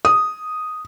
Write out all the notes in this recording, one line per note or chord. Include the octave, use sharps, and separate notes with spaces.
D#6